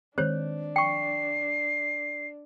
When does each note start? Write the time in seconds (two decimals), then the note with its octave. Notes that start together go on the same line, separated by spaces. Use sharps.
0.18 D#3 G#3 C4 D4 C5 C#5
0.76 G5 C#6 C7